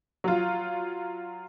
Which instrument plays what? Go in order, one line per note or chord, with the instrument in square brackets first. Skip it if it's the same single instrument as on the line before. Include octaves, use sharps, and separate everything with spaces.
[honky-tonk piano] F#3 F4